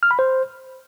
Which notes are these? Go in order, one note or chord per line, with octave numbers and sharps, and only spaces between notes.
F6
B5
C5